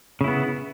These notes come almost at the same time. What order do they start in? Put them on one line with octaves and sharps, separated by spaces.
C#3 E4 B3